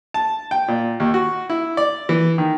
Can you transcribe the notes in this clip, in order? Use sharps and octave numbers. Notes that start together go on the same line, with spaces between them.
A5
G5
A#2
D#2
F#4
E4
D5
E3
D#3